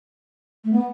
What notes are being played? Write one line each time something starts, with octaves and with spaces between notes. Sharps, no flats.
A3
B3